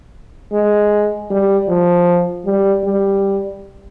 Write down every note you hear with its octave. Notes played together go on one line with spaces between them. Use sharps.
G#3
G3
F3
G3
G3